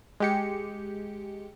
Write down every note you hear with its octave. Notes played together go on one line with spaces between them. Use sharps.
G#3 G4 C#7